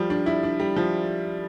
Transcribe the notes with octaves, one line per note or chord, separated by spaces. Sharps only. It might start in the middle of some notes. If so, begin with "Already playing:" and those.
Already playing: F3 G3
D4
E4
D4
G3
F3